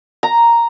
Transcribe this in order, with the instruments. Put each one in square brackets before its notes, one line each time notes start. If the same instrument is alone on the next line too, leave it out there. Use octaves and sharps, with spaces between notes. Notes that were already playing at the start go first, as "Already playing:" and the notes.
[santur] A#5